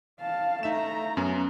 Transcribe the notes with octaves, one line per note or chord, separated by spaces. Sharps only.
F5 A5
A3 D#4 E5 A#5 E7
F#2 B3 C#4